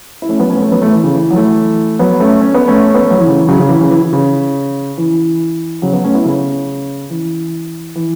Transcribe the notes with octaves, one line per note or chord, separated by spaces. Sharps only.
E4
A3 C#4
F#3 B3
A3 C#4
B3
A3 C#4
F#3 B3
E3 A3
E3
C#3
E3
F#3
E3 A3
F#3 B3
A3 C#4
C#4
B3
A3 C#4
B3
A3
F#3
E3
C#3
E3
C#3 F#3
C#3
E3
C#3
E3
E3
C#3
E3
C#3 F#3
F#3 B3
A3 C#4
B3 E4
C#3
E3
E3